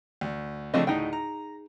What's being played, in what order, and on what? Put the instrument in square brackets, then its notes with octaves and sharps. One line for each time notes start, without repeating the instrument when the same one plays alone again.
[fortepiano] D2
[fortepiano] C#3 A3 D4 [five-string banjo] F3 C4 D#5
[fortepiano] D2 A2 D#5 [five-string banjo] D#4 G#4 G5
[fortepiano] A#5